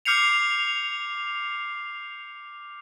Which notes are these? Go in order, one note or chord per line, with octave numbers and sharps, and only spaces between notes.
D6 F6 G6 C7 C#7 F7